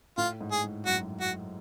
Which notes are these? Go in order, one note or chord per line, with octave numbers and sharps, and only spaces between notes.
A2 F4
G#2
G#4
G#2
F#2 F#4
F#4